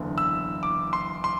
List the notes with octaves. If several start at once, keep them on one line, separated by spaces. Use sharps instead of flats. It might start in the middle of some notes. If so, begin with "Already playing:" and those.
Already playing: F#1 E2 D3
E6
D6
C6
C6